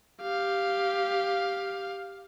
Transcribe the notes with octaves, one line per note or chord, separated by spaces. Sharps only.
G4 F5